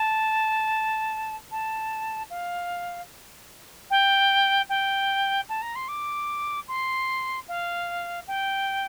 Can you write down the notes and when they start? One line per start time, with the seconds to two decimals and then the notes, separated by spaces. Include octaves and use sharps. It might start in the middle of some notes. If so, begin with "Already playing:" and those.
Already playing: A5
1.51 A5
2.30 F5
3.90 G5
4.69 G5
5.49 A5
5.62 A#5
5.75 C6
5.88 D6
6.68 C6
7.48 F5
8.27 G5